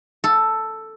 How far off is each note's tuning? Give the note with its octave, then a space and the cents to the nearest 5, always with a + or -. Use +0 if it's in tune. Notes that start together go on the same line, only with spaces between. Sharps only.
A4 +5